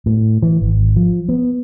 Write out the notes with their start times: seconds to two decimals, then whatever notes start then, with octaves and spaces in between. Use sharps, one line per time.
0.06 A2
0.42 E3
0.62 G#1
0.96 F3
1.29 B3